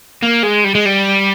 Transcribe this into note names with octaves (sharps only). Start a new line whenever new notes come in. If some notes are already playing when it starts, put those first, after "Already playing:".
A#3
G#3
G3
G#3
G3